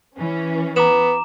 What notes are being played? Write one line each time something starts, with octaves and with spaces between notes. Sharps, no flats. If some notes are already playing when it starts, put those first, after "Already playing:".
E3 C#4
B3 A#5 D6 E7